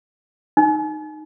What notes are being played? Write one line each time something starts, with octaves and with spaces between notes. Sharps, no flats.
D#4